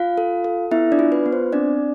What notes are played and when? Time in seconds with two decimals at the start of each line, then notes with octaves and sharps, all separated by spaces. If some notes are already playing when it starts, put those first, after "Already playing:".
Already playing: F4 F5
0.18 A4
0.44 A4
0.71 B3 E4 E5
0.92 D4 D5
0.99 F4
1.12 B4
1.26 B3
1.33 C5
1.53 C4 D4 D5